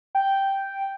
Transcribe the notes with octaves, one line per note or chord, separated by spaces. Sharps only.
G5